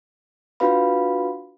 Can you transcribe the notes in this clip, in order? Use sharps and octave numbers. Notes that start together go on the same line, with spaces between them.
D4 F4 F#4 B4 F5 B5